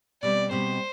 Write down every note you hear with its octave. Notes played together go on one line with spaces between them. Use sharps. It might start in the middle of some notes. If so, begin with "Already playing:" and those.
B2 G3 C4 D5
B2 G3 C4 C5